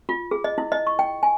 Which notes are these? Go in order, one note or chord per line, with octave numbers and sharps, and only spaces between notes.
F4
G#4
D#5
E4
D#5
C#6
G5
G#5